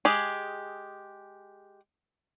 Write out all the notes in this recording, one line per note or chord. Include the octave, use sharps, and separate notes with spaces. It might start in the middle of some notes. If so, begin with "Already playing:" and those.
G#3 G4 G#4